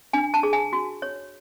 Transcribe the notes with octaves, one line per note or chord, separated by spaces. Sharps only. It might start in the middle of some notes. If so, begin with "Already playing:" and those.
D4 G#5
A5
G#4
G#5
F#4
C#5